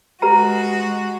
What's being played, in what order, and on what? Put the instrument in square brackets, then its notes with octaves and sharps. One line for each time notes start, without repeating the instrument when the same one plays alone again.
[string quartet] G#3 F#4 [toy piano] G4 B4 A#5